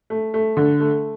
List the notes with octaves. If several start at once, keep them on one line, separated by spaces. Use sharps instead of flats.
A3
A3
D3
A3